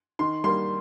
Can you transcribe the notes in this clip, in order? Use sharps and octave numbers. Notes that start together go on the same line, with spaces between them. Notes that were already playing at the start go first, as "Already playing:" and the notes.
D#3 C6
G3 A#3 C6